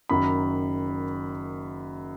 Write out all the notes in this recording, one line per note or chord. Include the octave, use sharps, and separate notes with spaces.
F#1 F#2 D#3 F#3 B5